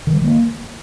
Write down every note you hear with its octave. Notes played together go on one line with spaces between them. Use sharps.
D#3
G3
D#3
A#3